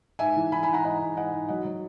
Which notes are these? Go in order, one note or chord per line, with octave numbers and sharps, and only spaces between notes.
G#2 E5 G#5
E3
E3 G#5 B5
G#5 B5
G#2
F#5 A#5
G#2 D#5 F#5
G#2
G#2 D#5 F#5
G#2
F#3 D#5 F#5
F#3